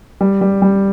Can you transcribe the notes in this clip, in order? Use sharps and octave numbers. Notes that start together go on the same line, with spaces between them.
G3
G3
G3